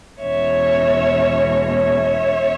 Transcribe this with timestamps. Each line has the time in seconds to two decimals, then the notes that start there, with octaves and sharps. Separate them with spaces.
0.20 E2 B2 G#3 C#4 C#5 E5
1.66 C#5 E5